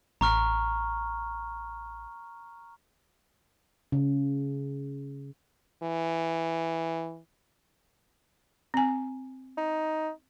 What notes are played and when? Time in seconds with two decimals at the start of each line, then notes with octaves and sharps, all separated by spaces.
0.21 A1 A#5 C#6 F6
3.92 C#3
5.83 E3
8.74 C4 G#5
9.57 D#4